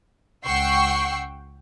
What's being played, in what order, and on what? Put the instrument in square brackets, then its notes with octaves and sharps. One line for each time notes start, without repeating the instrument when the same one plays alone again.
[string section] C#2 F#5 G5 C#6 E6 C7